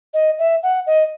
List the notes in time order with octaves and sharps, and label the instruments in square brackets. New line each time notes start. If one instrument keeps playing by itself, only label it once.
[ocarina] D#5
E5
F#5
D#5